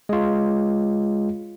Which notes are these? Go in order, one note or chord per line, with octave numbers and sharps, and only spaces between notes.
G#3 F4